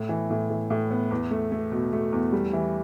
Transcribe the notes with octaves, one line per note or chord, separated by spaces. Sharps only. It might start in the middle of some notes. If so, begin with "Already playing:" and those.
Already playing: A2
E3
A2
E3
A2
B3
E2
A3
A3
B2
A3
E2
G3
E3